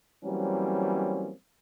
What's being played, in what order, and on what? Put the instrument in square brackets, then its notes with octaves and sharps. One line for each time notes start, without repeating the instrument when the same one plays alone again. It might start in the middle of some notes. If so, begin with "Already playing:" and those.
[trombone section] E3 F#3 G3 A#3 C4 C#4